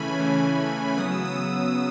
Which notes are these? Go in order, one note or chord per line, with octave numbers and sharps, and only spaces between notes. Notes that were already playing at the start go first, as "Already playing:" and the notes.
Already playing: C#3 E3 A3 C#4 G#5 B5
C#3 E3 A3 C#4
C#3 F#3 B3 D#6
E6
D#6
B3